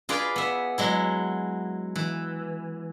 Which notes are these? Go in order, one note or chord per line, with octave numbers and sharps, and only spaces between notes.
F4 G#4 B4 D5 F5
B3 E5
F#3 G#3 E4
E3